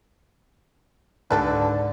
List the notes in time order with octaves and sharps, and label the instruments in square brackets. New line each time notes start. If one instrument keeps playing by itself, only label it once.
[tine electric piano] C#2 G#2 [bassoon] D3 [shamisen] G4 A4 B4